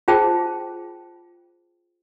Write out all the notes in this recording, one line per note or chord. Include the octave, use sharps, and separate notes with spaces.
F4 G#4 C5 G5 A5